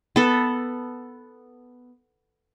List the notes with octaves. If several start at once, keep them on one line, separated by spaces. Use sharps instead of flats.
B3 A4